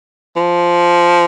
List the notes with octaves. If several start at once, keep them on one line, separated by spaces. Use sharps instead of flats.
F3